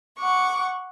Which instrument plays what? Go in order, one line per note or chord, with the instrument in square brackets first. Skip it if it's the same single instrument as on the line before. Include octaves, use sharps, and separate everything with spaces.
[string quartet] F#5 C#6 D6